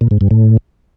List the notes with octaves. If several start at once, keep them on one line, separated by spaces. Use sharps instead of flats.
A#2
G#2
G2
A2